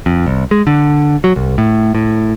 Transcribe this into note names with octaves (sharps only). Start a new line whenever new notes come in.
F2
C2
G#3
D3
F#3
C2
A2
A2